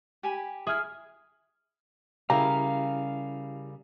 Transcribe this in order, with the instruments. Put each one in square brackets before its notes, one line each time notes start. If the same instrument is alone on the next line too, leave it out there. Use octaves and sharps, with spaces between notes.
[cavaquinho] G4 G#5 B5
[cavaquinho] E4 E5 [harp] G#4 F6
[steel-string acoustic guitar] C#3 G3 A#4 [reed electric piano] E4 G4 [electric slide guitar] F5 [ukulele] A#5